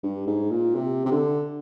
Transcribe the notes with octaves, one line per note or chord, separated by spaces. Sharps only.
G2
G#2
A#2
C3
C3
D3